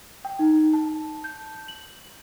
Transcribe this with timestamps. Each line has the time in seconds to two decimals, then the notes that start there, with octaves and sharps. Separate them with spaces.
0.25 G5
0.39 D#4
0.73 A5
1.24 G6
1.68 F#7